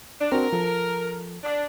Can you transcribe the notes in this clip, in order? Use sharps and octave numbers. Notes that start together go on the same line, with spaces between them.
D4
C4 D4 F#4 A#4
F3 A4
D4